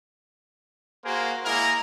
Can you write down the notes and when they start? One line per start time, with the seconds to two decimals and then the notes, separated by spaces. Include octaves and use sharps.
1.05 A#3 F#4 G#4 A#4 C5
1.45 G#3 A#3 E4 A#4